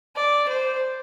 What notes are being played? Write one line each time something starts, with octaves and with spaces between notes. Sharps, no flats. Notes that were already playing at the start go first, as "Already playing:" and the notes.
D5
C5